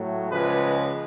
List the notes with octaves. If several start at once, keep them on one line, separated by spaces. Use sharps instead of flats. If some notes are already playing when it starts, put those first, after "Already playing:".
Already playing: A2 F#3 A3
C#2 C#3 F3 G#3 B4